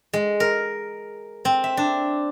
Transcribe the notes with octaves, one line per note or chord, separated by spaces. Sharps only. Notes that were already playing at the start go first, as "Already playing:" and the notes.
G#3
A#4
C4
E5
D4